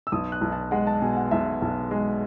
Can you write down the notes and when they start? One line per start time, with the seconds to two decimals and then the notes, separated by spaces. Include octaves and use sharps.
0.07 E6
0.12 B1 D#6
0.32 F#6
0.41 B1
0.52 A5
0.71 G#3 F#5
0.87 A5
1.01 B2 G#5
1.16 F#5
1.31 B1 E5
1.62 B1
1.91 G#3